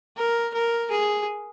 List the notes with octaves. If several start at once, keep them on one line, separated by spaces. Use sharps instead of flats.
A#4
A#4
G#4